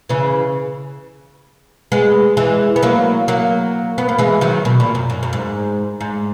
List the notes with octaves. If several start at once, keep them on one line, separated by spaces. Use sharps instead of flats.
C#3 E3
G#3 B3
E3 G#3
B3
F#3 A#3
F#3 A#3
B3
A#3
E3 G#3
D#3 F#3
B2
A#2
F#2
F#2
F#2
G#2
G#2